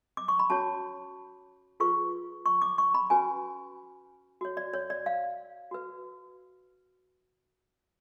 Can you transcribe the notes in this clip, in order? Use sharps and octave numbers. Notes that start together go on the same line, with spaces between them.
D6
C#6
B5
C#4 F#4 C#5 A5
F4 G#4 B4 C#6
C#6
D6
C#6
B5
C#4 F#4 B4 G#5
F#4 C#5
D5
C#5
D5
F5
F#4 B4